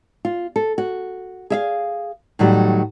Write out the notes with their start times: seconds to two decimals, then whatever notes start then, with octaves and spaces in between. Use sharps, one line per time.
0.25 F4
0.56 A4
0.78 F#4
1.50 G#4 E5 F5
2.39 A2 D#3 F#3 G3